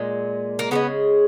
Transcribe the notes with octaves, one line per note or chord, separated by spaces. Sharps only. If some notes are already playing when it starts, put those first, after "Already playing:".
Already playing: A#2 G#3
A#3
C#3 F3 G#3 B3